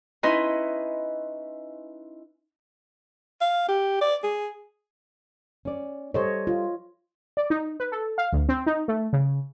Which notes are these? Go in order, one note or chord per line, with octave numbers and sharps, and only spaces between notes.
C#4 D#4 E4 B4 D#5 C6
F5
G4
D5
G#4
C#4 D5
G3 A4 C5 C#5 D#5
F4
D5
D#4
B4
A4
F5
D2
C4
D#4
A3
C#3